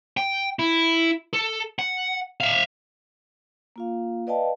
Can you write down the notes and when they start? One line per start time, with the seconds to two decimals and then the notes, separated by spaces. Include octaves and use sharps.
0.17 G5
0.59 E4
1.33 A4
1.79 F#5
2.40 E5 F5
3.76 A#3 F4 F5
4.27 B4 D5 D#5 F5 G5 A5